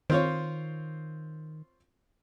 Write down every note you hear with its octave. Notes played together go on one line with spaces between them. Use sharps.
D#3 C4 F4 C#5